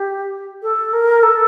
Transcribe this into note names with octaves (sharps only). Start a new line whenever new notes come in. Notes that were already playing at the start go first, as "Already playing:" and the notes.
Already playing: G4
A4
A#4
A4